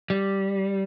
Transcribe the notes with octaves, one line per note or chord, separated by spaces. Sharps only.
G3